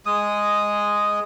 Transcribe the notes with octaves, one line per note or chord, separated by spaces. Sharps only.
G#3 D#6